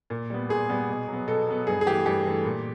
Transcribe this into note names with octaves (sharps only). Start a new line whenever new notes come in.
A#2
G3 B3
A#2 G#4
G3 B3
B2
F#3
B3
B2 A4
F#3 B3
G2 G#4
G#4
E3 A3 G4
G2 G4
E3 A3
A#2